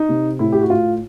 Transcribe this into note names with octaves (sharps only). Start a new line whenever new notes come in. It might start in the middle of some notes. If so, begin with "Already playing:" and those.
Already playing: D#4
C3
A2 E4
G4
F#4
A2 F4